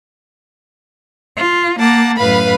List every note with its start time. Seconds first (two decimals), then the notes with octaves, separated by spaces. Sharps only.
1.36 F4
1.79 A#3 F#5 A5 D6
2.17 F#2 A2 B4 F5 B5